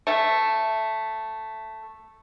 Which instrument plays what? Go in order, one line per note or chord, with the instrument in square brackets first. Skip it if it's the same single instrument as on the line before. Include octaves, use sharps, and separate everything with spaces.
[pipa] A3 E5